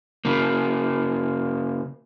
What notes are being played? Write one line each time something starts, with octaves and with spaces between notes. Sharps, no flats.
C#3 A#3